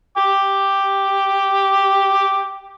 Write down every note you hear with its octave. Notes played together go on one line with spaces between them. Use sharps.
G5 D6